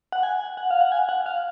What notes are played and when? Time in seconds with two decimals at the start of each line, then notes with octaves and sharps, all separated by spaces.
0.12 F#5
0.23 G#5
0.57 F#5
0.71 F5
0.81 F#5
0.92 G#5
1.09 F#5
1.26 F5